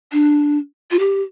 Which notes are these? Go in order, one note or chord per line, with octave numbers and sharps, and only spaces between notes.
D4
F4
G4